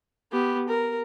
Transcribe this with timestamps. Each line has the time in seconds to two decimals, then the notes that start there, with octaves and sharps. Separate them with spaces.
0.32 B3 G4
0.69 A#4